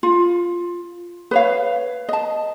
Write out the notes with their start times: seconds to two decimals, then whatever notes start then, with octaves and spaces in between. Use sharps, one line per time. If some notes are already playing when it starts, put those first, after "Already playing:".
0.03 F4
1.31 B4 C#5 F5
2.09 D#5 A5